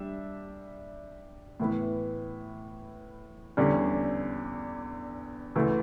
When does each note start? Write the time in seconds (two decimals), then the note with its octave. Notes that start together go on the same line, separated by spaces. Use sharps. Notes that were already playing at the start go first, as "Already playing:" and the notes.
Already playing: G3 D4 E5
1.60 A2 E3 B3 E4
3.57 E2 D3 G3 C#4
5.55 D2 C#3 E3 A3